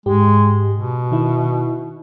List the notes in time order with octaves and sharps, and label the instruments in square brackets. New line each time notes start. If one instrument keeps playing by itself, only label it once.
[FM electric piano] G#2 G4 [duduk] G#3
[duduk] B2
[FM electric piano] D#3 E4